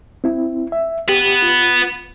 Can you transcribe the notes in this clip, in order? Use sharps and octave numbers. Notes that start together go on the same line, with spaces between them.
C4 E4
E5
B3 G4 B4
F4